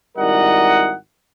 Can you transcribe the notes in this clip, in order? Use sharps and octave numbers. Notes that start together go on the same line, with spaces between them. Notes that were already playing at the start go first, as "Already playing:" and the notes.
G#1 G3 E4 A#4 D#5 F#5